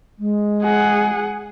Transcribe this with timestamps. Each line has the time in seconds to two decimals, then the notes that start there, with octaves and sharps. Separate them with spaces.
0.18 G#3
0.62 G#4 F#5